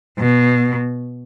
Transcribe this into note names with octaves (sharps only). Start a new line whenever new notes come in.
B2